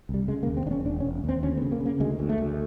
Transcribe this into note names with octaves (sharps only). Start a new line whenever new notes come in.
C2
G3
C#3 G#3
A#3
D#2
C4
E1 C#4 D4
E1 D4
C#4
E1
D#2 C4
D2 C#4
B3
C#3
A#3
C#3
A#3
D2 G#3
D2
A3
D2